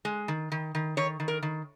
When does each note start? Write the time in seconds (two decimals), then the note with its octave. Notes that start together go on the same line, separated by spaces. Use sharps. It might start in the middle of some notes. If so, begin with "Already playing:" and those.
0.05 G#3
0.28 D#3
0.52 D#3
0.75 D#3
0.97 D#3 C#5
1.20 D#3
1.28 A#4
1.42 D#3